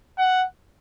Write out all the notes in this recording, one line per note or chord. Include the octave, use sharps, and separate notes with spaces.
F#5